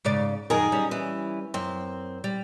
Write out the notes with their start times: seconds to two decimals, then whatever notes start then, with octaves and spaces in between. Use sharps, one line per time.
0.05 G#2 C#3 D5
0.50 F#2 D#3 D#4 G#4 A#4
0.72 G3 C#4
0.91 E3
1.54 F#2 C4
2.24 G3